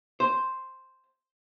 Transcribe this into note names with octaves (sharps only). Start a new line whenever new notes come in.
C5